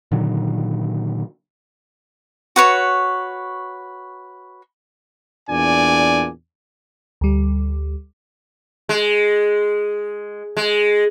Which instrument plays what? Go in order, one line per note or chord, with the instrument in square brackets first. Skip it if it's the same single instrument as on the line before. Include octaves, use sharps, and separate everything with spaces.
[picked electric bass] A#2 D3 D#3 F#3
[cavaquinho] F#4 B4 C#5
[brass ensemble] E2 A#2 D4 D5 G#5
[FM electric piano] D2 G3
[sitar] G#3
G#3